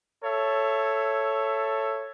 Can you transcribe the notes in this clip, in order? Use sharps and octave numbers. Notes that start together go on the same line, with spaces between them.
A4 C#5 E5